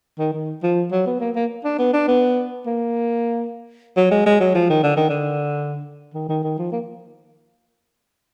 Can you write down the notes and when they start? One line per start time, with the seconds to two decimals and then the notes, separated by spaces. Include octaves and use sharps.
0.18 D#3
0.33 D#3
0.63 F3
0.91 F#3
1.06 B3
1.20 A#3
1.35 A#3
1.64 D4
1.79 B3
1.93 D4
2.08 B3
2.66 A#3
3.97 F#3
4.11 G#3
4.26 G#3
4.40 F#3
4.55 F3
4.70 D#3
4.83 D3
4.97 D#3
5.09 D3
6.14 D#3
6.29 D#3
6.43 D#3
6.58 F3
6.72 A#3